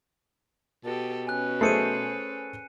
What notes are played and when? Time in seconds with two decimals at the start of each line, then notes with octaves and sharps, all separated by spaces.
0.85 B2 G4 A4
1.27 C#4 B4 G#5 F#6
1.61 A3 G#4 C5 C7 C#7 D#7